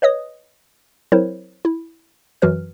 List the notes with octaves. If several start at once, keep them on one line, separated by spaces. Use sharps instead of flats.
B4 C#5 D#5 D#6
F#3 C4 E4 A#4 C5 C#5
E4
F#2 E3 F#3 F#4 B4 F6